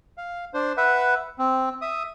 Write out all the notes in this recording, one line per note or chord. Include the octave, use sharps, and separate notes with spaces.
F5
D4 C5
B4 E5 F#5
C4
E5 D#6